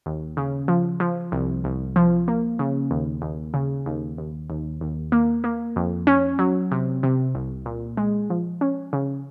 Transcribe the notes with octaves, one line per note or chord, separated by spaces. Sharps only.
D#2
C#3
F3
F3
C2
C2
F3
A#3
C#3
D#2
D#2
C#3
D#2
D#2
D#2
D#2
A#3
A#3
F2
C#4
F#3
C3
C3
C2
A#2
G#3
F3
C#4
C#3